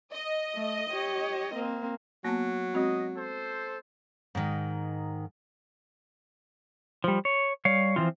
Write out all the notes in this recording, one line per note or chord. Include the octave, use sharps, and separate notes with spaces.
D#5
A3
G4 C#5
A#3 C4
F#3 A#3 B3
G#3 C4 F#4 D#5
A4 C5
G#2 D#3
F3 G3
C#5
G3 C#5 F5
E3 F3 C4 F4